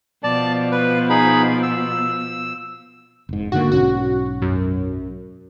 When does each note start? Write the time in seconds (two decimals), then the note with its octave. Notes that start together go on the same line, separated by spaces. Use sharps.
0.24 B2 F3 D5 A5
0.72 B4
1.10 D#4 G#4 B5
1.63 E6
3.29 F1 G#2
3.52 G#2 D3 A#3 F#4
3.72 B1 G#2 C#4 F#4
4.42 F#2